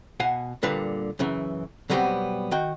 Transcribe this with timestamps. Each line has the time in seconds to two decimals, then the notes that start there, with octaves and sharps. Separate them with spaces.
0.20 B2 F5 F#5 G#5
0.63 A#2 D3 G3 D4 B4 F5
1.19 F#2 C#3 E3
1.90 B2 F#3 G3 B3 C4 G4
2.51 D#3 F#4 G5